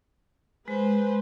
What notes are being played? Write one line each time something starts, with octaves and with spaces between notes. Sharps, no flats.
G#3 G#4 B4 C5